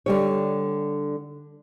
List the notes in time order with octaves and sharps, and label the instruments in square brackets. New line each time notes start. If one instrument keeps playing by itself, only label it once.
[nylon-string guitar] D3 G3 C#5